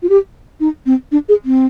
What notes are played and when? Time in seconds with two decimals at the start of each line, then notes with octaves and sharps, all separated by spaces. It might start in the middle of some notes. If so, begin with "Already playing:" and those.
0.02 F4
0.09 G4
0.60 D#4
0.86 C4
1.12 D4
1.29 G#4
1.45 C4